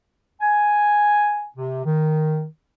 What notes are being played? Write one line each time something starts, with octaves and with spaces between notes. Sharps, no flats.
G#5
C3
D#3